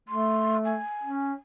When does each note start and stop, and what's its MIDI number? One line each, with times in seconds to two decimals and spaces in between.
0.09 0.79 57
0.09 0.57 84
0.65 1.33 80
1.03 1.33 61